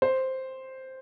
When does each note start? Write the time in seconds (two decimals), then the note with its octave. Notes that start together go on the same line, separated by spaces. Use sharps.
0.02 C5